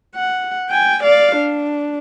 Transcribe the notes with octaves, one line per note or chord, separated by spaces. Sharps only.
F#5
G5 G#5
D5 F5
D4